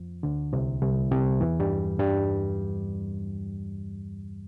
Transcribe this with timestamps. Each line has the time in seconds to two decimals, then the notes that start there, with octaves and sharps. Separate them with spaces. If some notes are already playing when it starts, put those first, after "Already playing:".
Already playing: F2 F3
0.23 D2 D3
0.53 C2 C3
0.82 C2 C3
1.11 C2 C3
1.41 E2 E3
1.60 G2 G3
1.99 G2 G3